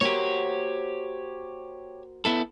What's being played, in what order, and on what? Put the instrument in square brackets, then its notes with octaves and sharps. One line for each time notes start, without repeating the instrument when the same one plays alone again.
[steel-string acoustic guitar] A#3 F#4 C5 [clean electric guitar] G4 C#5
[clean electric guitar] B3 E4 A4